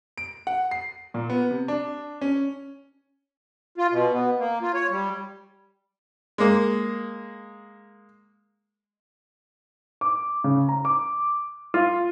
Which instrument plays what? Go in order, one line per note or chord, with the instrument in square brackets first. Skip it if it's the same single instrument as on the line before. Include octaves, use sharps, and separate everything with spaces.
[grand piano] D7
F#5
C7
A#2
B3
C3
D4
C#4
[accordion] F4
B2
B3
A#3
F4
C#5
G3
[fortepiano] G#3 A#3
[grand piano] D6
C#3
A#5
D6
F4